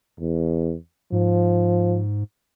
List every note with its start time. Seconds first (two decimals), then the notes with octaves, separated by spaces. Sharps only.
0.20 E2
1.12 G#2 F3